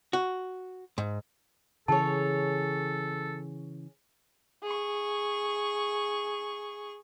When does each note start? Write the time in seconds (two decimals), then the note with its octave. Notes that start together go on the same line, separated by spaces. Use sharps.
0.13 F#4
0.98 G#2
1.88 C#3 E3 G#4 A4 C#5 A5
4.63 G#4 C#6